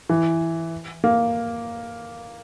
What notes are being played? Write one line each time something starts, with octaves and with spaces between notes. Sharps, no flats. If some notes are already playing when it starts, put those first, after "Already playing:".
E3
A#3